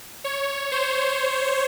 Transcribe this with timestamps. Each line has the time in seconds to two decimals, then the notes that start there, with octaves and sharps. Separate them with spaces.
0.24 C#5
0.72 C5